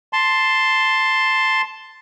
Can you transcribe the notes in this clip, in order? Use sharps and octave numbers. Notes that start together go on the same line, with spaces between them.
A5 C6